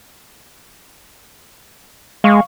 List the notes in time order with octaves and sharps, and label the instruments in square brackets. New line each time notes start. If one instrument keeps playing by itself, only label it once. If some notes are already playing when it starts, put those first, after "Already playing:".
[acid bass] G#3 [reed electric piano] F5 C#6